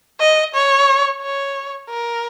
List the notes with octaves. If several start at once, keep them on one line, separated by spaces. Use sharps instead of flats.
D#5
C#5
C#5
A#4